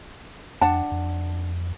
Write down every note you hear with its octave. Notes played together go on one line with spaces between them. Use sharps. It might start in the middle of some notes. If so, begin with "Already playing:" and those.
F2 D4 F#5 A5
F2